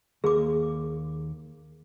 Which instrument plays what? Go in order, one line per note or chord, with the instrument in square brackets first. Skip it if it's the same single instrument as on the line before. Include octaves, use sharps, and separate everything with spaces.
[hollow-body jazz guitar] D#2 A#3 [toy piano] G#4 D6